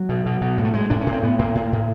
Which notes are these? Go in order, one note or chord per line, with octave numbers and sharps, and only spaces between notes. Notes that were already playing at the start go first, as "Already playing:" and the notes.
Already playing: F#3
B2
B2
B2
A2
A3
A2 G#3
A2 D4
C#4
A2
C4
A2 B3
A2 A#3
A2
A2